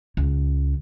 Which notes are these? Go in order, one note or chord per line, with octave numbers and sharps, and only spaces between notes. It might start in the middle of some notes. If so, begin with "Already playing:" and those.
C#2